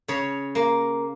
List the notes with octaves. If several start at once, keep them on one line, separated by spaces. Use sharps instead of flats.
C#3 C#5
A#3